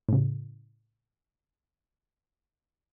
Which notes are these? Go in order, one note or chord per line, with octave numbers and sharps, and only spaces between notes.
A2 C#3